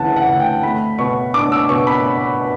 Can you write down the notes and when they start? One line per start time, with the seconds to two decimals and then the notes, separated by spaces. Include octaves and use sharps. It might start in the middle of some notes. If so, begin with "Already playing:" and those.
Already playing: D2 C#3 E3 F#5 A5
0.16 F#5
0.27 D2
0.40 G5
0.63 A3 B5
0.99 B2 C#6
1.34 D4 D6
1.52 E6
1.69 B2 C#6
1.87 B5